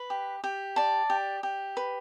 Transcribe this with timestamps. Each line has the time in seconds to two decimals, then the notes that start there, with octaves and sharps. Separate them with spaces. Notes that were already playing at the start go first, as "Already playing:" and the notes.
Already playing: B4
0.10 G4
0.44 G4
0.76 D5 A5
1.10 G4
1.43 G4
1.77 B4